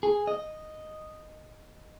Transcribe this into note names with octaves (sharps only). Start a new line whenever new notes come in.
G#4
D#5